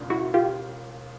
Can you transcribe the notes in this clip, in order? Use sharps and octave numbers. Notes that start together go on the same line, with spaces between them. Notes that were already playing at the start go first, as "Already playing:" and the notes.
Already playing: E1 D#2 C#3 F3 D4
E4 F#4
F4 G4